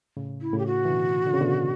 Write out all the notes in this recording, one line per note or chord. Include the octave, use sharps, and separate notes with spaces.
A2 C#3
E4
A2 C#3 G4
F#4
E3
B2 D3
D3
C#3
B2 D3